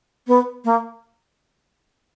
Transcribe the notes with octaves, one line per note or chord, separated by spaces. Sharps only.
B3
A#3